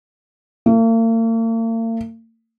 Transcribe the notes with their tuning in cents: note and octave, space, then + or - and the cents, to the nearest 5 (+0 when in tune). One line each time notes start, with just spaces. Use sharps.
A#3 -45